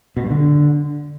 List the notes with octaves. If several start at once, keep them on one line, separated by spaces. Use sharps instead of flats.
B2
G2
D3